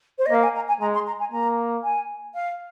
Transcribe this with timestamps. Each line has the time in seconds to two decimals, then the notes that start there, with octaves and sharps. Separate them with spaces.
0.18 C5
0.26 D#5
0.30 A#3 F5
0.43 G#5
0.55 A#5
0.68 G#5
0.81 G#3 A#5
0.94 C6
1.06 A#5
1.19 G#5
1.32 A#3 A#5
1.83 G#5
2.34 F5